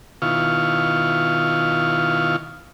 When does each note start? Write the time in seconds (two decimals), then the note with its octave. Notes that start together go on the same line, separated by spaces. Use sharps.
0.22 B2 D#3 E4 F4 F5 C#6